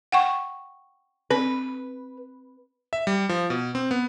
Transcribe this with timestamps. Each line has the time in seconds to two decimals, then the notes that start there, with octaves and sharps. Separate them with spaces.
0.12 F#5 G5 C#6
1.30 C4 B4
2.93 E5
3.07 G3
3.29 F3
3.50 B2
3.75 C4
3.91 B3